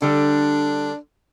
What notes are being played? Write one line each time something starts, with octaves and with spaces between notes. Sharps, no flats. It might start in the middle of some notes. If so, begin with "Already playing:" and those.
D3 G3 D4